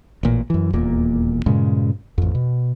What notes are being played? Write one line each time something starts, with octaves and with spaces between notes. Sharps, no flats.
A1 A#2
F#2 E3
D#1 E2 A#2 A#3
G2 A#2 C#3 G#3
A1 F2
B2